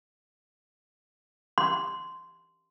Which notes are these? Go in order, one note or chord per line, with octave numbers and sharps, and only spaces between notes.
C6